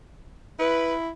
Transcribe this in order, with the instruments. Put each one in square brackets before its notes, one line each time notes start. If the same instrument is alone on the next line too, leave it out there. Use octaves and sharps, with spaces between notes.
[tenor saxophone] E4 [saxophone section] B4